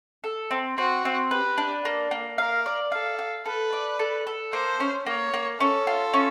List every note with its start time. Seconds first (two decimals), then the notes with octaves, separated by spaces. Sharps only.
0.24 A4
0.51 C4
0.78 C4 F#4
1.05 C4
1.31 G4 B4
1.58 D4
1.85 A#3
2.11 A#3
2.38 A#4 F5
2.66 D5
2.92 A4 F5
3.19 F5
3.46 A4 B4
3.73 D5
3.99 A4
4.27 A4
4.53 A#3 C5
4.80 C#4
5.06 A#3 C#5
5.34 A#3
5.60 C#4 A4
5.87 F4
6.13 C#4